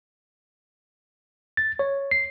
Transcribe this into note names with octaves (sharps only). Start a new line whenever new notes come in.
A6
C#5
C7